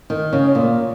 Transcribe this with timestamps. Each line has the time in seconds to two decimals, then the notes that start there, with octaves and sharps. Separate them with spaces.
0.10 D#3
0.33 C#3
0.55 A#2